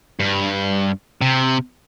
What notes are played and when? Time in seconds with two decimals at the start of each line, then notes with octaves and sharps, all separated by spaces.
0.20 G2
1.22 C3